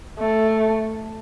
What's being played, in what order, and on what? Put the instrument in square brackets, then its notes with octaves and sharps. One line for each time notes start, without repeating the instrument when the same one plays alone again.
[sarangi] A3